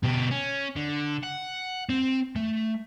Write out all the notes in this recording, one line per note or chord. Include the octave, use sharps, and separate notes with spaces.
B2 G4
C#4
D3
F#5
C4
A3